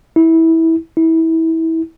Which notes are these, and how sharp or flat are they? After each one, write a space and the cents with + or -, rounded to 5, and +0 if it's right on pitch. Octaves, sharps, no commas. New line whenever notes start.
E4 -20
E4 -25